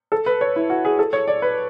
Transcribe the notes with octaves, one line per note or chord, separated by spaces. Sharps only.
A4
B4
C#5
E4
F#4
G#4
A4
C#5
D5
B4